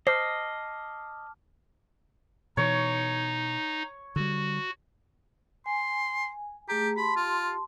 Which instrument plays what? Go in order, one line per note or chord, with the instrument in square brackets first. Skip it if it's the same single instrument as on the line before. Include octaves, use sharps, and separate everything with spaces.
[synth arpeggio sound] C5 [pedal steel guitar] D#5 [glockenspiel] A5 D6 F6 [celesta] C7
[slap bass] B2 E3 [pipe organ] D#4 [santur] C#5
[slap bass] D3 G3 [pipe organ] F#4
[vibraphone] G#5 [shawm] C6
[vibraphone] A3 G#4 A#5 [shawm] G4
[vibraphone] G4 A5 C6 [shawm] B5
[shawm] F4